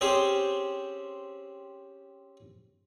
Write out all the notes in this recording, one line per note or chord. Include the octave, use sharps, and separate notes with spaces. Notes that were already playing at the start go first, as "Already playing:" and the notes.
C4 C#4 G4 G#4 C5